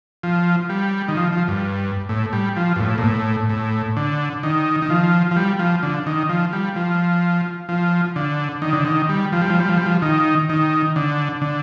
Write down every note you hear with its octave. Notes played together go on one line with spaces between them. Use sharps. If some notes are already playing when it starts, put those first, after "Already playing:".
F3
G3
D#3
F3
F3
G2
A2
G3
F3
G2
A2
A#2
A2
A2
D3
D#3
D#3
F3
F3
G3
F3
D3
D#3
F3
G3
F3
F3
D3
D#3
D3
D#3
G3
F3
G3
F3
G3
F3
G3
F3
D#3
D#3
D3
D3